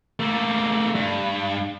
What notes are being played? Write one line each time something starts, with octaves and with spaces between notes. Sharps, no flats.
A3 A#3
G2